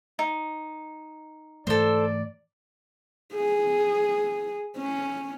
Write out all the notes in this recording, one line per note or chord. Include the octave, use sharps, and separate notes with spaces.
D#4
G#2 E3 A3 A4 C5 D5
G#4
C#4